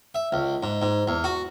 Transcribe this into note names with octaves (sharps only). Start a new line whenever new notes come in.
E5
C#2
G#2
G#2
E2
F#4